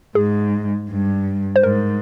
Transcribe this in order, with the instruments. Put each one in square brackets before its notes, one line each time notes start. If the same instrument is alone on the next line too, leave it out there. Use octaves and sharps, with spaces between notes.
[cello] G#2 [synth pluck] G#4
[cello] G2
[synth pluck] C5
[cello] G#2 [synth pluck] A#4